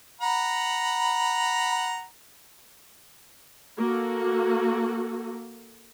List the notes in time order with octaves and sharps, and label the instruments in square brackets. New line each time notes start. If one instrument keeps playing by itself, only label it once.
[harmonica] F#5 A#5 B5
[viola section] A#3 F#4 A4